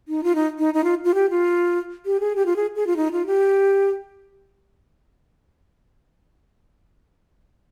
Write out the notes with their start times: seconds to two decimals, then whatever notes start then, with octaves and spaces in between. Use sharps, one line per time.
0.08 D#4
0.23 F4
0.35 D#4
0.58 D#4
0.74 D#4
0.84 F4
1.05 F4
1.14 G4
1.30 F4
2.06 G4
2.20 G#4
2.36 G4
2.46 F4
2.56 G#4
2.76 G#4
2.87 F4
2.97 D#4
3.12 F4
3.26 G4